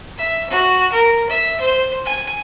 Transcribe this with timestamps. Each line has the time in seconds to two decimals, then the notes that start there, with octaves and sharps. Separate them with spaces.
0.18 E5
0.50 F#4
0.92 A#4
1.29 E5
1.61 C5
2.05 G#5